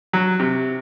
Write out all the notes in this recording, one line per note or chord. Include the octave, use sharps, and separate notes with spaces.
F#3
C3